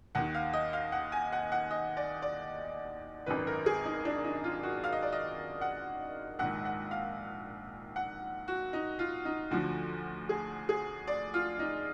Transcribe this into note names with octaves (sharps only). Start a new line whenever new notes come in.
D#2 D#3 F#5
F5
D#5
F5
F#5
G#5
F#5
F#5
D#5
D5
D5
G#1 F#2 D#3 B4
A#4
G#4
D#4
D4
D#4
F4
F#4
F5
D#5
D5
D#5
F#5
A#1 G#2 D#3 F#5
F#5
F5
F#5
F#4
D#4
F4
D#4
D2 D3 F3 F#4
G#4
G#4
D5
F4
D#4